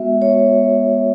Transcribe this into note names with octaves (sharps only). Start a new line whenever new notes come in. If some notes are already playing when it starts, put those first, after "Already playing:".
Already playing: G#3 B3 F#4 E5
C#5